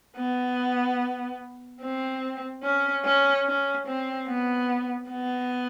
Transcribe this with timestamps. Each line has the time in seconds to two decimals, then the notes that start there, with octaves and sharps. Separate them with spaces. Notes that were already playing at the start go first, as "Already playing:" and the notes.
0.16 B3
1.81 C4
2.63 C#4
3.04 C#4
3.46 C#4
3.86 C4
4.28 B3
5.10 B3